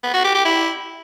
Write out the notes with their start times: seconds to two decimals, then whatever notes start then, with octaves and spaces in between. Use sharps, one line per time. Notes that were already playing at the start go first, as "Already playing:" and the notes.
0.03 B3
0.14 F#4
0.24 G4
0.35 G4
0.45 E4